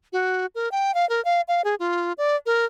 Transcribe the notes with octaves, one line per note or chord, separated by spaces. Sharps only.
F#4
A#4
G5
F5
A#4
F5
F5
G#4
F4
D5
A#4